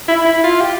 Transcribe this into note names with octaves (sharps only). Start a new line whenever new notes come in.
E4
E4
F4
G4